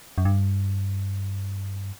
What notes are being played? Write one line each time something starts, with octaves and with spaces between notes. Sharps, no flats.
F#2
G2